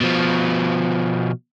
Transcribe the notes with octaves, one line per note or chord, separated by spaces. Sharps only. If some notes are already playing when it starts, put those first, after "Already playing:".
B2 F3